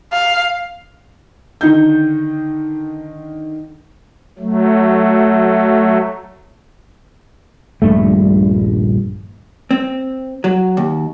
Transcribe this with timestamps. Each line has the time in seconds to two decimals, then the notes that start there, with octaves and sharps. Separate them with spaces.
0.12 F5
1.61 D3 D#3 D#4 G6
4.39 F#3 A3
7.82 D#1 A#1 G2 A3
9.71 C4
10.44 F#3
10.77 D#2